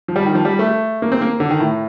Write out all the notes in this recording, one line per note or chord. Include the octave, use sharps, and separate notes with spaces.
F3
G3
D#3
F3
G3
A3
A#3
C4
A#3
D3
D#3
A2